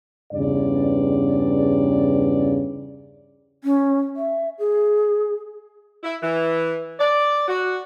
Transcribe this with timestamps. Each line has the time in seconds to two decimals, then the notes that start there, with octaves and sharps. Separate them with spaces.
0.33 E2 G2 C#3 D5
3.64 C#4
4.16 E5
4.59 G#4
6.03 E4
6.23 E3
7.00 D5
7.48 F#4